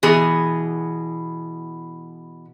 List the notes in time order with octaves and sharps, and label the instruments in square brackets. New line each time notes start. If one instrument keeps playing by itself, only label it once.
[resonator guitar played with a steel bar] B2 E3 B3 G#4